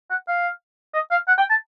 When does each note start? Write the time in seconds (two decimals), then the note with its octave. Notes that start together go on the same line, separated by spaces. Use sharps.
0.10 F#5
0.28 F5
0.94 D#5
1.11 F5
1.28 F#5
1.38 G5
1.50 A5